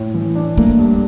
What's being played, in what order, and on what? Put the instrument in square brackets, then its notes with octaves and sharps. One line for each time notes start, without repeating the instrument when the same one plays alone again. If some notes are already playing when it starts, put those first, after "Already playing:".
Already playing: [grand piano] A2
E3
D4
[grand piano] A3 [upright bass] A#3
[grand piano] G2